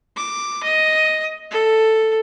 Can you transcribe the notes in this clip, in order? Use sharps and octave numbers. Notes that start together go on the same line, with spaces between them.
D6
D#5
A4